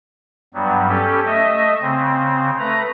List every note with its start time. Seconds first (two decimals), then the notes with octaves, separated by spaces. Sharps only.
0.54 G2 F#3 G3 B3
0.88 C#4 G4 A4
1.25 A3 D#5 E5
1.81 C#3 C4
2.59 A3 B4 A#5